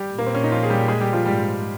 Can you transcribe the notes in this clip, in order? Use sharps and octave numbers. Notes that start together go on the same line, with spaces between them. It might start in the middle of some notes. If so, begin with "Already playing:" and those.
Already playing: G3 G4
A#2 A#3
C4
C#4
D#4
F3 F4
G#4
G3 G4
G#3 G#4
G3 G4
F3 F4
G#2 G3 G4